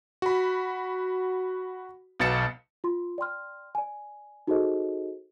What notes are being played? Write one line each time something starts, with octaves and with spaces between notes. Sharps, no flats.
F#4 B5
B1 B2 A6 C#7 E7
F4 C6
D5 G5 C6 F6
D5 G#5
D#4 F#4 G#4 A4 C5 D#5